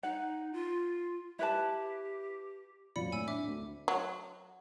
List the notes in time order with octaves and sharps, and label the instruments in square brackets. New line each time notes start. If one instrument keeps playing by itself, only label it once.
[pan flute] D#4 [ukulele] F#5
[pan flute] F4
[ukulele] E4 B4 A5 [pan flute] G4
[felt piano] F2 A#2 F#3 [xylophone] D5 B5 C#7
[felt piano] A2 [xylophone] G#5 E6
[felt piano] D4 [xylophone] E5 D6
[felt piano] D2
[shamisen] F#3